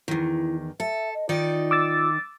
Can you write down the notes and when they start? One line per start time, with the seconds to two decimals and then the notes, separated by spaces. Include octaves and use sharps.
0.08 E2 D#3 E4
0.80 A4 E5
1.14 D#5
1.29 D#3 D#4 F4 D5
1.71 D6 E6 A6